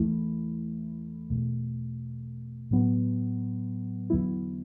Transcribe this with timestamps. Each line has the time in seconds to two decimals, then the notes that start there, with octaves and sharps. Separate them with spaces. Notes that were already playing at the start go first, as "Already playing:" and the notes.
Already playing: E2 E3 A3 E4
1.30 E2 B2 A3
2.71 A2 F#3 B3
4.10 E2 D3 F#3 B3 E4